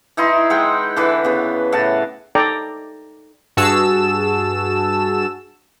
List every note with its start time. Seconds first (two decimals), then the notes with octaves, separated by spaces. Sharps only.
0.17 E3 D#4 E4 C6
0.50 G#3 F#5 G5
0.97 D3 E3 B4
1.25 C#3 B3
1.72 A2 F#5 A5
2.35 D#4 A4 D5 G5 A#5 D6
3.57 G2 F#4 G#4 A5 E6 E7